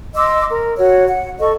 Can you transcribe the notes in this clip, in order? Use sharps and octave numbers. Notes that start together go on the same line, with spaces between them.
D#5 C6 D6 E6
A#4
F#4 C#5
F#5
A4 D#5 C#6